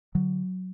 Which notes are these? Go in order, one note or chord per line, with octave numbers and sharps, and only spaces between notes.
D3 F#3